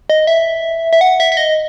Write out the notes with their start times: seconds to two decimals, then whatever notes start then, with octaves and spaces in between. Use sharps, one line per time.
0.10 D#5
0.27 E5
0.93 E5
1.01 F#5
1.20 E5
1.32 E5
1.37 D#5